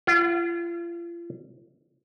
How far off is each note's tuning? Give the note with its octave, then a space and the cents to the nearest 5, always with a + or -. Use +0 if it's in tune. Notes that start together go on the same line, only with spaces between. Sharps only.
F4 -40 F#5 +0